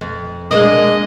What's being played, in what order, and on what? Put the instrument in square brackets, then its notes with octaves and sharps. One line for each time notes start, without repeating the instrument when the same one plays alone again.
[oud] F2
[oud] G#3 A#3 D4 [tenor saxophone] D#5